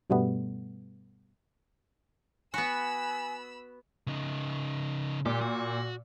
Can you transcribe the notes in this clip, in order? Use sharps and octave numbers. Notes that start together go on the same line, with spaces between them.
G2 B2 G3 A3 B3
B3 F#4 G#5 B5 E6
C#3 D#4
A#2 G4
F#4